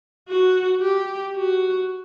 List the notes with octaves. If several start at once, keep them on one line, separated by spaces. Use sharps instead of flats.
F#4
G4
F#4